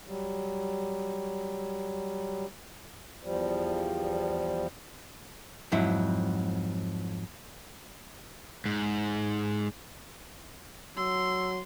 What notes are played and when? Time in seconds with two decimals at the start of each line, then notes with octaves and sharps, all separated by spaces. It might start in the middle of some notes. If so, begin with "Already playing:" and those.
0.06 F#3 G3
3.23 E2 F3 G3
5.72 F2 G#2 F#3 E4
8.66 G#2
10.97 F#3 C6 E6